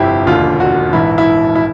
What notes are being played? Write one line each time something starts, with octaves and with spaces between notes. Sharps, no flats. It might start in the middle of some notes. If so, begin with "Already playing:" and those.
Already playing: G1 F2 C3 F3 E4 G4
E1 D#2 D3 F4
F#4
A#1 G#2 E3 E4
E4
E4